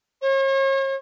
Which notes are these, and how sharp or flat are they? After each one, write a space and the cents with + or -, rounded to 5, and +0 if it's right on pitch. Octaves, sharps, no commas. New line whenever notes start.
C#5 -40